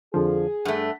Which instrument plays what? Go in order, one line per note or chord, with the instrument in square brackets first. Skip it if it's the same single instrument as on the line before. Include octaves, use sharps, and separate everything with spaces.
[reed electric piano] F2 D3 F3 [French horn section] G#4
[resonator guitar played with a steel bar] G2 A3 [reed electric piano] F#5